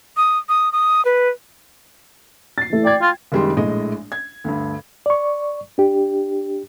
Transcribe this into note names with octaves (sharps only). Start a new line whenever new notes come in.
D#6
D#6
D#6
B4
A6 C7
E3 A3
D5 G5 G#6
F4
F#1 D#3 G3 G#3 C6
A#1 A2 G#3 D#5
G#6
D2 G2
D5 C#6
D4 G4